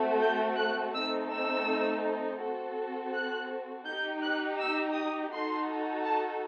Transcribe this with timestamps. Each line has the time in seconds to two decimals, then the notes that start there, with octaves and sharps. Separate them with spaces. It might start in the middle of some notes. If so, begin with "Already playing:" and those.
Already playing: A3 C4 F#4 A4
0.21 G6
0.58 F#6
0.94 A3 C4 D#4 A4 E6
1.31 E6
2.41 C4 F#4 A4
3.13 F#6
3.85 D#4 G4 G6
4.22 F#6
4.59 E6
4.94 D#6
5.31 D#4 F#4 A4 C6
6.05 A5